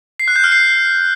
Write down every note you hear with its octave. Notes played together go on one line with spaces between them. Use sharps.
C7
F#6
G6
F6
C7